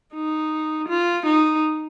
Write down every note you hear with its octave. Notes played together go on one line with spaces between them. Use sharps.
D#4
F4
D#4